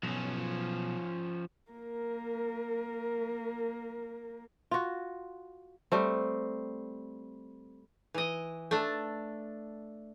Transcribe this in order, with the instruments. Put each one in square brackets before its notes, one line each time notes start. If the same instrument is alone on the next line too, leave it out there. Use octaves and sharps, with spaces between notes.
[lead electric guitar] B1 [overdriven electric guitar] F3 C#4
[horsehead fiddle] A#3 A#4
[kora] F4 F#4
G3 A3 C4
[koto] E3 D#5
A3 D4